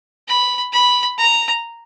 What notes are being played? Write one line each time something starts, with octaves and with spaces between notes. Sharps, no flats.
B5
B5
A#5